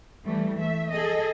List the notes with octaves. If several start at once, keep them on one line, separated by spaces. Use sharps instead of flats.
E3 G3 A3
A3 E5
G#4 A4 D#5